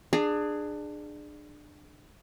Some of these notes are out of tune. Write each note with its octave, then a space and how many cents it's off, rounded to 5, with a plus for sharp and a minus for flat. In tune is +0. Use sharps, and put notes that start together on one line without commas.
D4 +25 G#4 +0